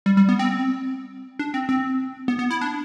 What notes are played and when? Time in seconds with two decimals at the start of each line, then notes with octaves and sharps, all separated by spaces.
0.06 G3
0.17 G3
0.29 B3
0.39 C4
1.39 D4
1.54 C4
1.69 C4
2.28 B3
2.39 B3
2.50 E4
2.61 D4